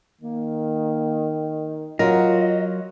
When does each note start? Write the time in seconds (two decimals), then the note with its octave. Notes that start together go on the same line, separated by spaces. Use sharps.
0.21 D#3 A#3
1.99 F#3 F4 A#4 D#5